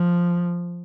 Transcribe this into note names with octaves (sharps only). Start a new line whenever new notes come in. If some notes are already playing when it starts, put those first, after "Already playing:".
Already playing: F3